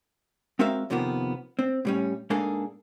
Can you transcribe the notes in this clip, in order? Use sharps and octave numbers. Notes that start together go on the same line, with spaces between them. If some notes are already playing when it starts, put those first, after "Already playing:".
G#3 C4 F#4 A#4 E5 F5
F2 C3 D#3 F3 A#3 B3
C4
A2 G3 C#4
G#2 A#3 D4 G#4 A4